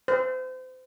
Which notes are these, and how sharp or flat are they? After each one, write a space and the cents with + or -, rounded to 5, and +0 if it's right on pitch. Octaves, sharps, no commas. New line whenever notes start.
C5 -30